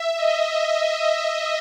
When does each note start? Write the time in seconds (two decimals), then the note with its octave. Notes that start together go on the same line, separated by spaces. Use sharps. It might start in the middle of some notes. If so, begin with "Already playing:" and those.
Already playing: E5
0.15 D#5